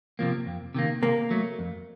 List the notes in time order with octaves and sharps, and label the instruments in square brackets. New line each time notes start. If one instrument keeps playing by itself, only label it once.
[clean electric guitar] C3 F3 A#3
F2
C3 D#3 A#3
[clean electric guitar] C3 [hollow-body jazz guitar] A#3
[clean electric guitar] F#3 A3
F2